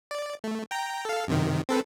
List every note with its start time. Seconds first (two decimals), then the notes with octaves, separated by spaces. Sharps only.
0.11 D5
0.44 A3
0.71 G5 A#5
1.05 A4 F5
1.27 F#2 C3 D#3
1.69 C4 A4 B4